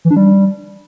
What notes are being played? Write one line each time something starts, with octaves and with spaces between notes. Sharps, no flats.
E3
D4
G3